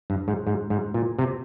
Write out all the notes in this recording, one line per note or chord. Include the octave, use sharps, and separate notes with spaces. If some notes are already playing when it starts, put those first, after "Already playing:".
G2
G#2
G#2
G#2
A#2
C3